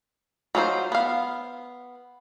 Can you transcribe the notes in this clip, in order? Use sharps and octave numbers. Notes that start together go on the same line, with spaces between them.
F#3 D#4 F4 G#4 C5
B3 F5